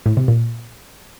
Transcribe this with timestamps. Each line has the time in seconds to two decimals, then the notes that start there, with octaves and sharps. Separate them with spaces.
0.06 A2
0.17 C3
0.28 A#2